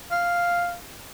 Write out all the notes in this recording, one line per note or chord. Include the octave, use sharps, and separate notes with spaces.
F5